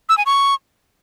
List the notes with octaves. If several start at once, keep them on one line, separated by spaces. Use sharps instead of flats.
E6
G#5
C#6